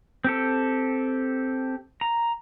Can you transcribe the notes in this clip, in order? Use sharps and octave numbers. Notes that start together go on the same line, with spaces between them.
C4 G4 A4
A#5